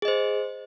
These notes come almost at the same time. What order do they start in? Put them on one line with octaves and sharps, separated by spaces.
G#4 D#5 C5